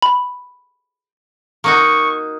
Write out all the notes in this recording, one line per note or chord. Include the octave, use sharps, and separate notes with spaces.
B5
A#3 D#4 F#4 C#6